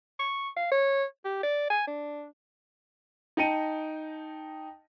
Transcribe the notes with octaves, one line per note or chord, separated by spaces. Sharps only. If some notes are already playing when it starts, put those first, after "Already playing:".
C#6
F5
C#5
G4
D5
G#5
D4
D#4 D#5 G5 A5 C#7 D#7